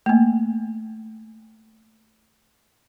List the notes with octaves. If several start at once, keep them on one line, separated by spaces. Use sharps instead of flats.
A3 A#3